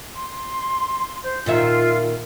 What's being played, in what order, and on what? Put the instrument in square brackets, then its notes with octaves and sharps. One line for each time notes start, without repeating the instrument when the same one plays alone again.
[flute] C6
C5
[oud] A#2 D#3 E5 [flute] F4